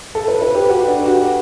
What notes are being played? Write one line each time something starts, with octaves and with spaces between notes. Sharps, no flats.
A4
B4
B4
G4
F#4
D4
F#4